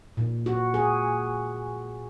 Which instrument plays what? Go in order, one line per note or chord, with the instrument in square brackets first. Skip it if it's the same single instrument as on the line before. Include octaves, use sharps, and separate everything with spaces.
[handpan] A#2
F#4
G#4